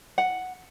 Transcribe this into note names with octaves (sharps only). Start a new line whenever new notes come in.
F#5